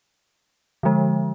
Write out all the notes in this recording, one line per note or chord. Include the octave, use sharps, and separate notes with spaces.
D3 F3 G#3